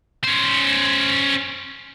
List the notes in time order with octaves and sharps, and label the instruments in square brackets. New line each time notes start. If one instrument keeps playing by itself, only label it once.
[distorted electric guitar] C#4 C5